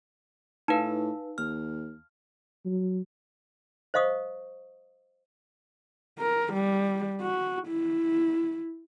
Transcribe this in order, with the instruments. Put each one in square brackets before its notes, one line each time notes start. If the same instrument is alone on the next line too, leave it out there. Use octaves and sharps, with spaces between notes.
[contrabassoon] A2 [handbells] D#4 B4 [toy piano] F5 A5
[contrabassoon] D#2 [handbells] F6
[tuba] F#3
[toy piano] C5 D#5 F5 C#6 D#6
[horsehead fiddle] A#4
G3
F#4
E4